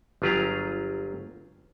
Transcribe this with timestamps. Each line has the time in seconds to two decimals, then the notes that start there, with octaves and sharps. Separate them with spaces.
0.22 G1 F#3 F4 G4 G#4 A#5